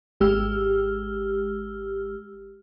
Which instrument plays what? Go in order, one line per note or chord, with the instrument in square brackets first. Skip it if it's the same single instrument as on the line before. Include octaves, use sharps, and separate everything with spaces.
[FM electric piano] G#1 G#3 G4 E6 F6